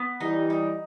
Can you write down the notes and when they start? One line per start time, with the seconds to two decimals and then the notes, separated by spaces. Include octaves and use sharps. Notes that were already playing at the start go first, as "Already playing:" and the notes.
Already playing: B3
0.20 E3 G3 D#4
0.50 D#4